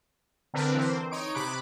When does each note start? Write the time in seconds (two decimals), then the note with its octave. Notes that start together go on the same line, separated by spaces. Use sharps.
0.54 D3 C4 D4 A#4 B4
0.74 E3 C4 C5
1.11 D#4 C#5 D7
1.35 C3 B5 D6 F#6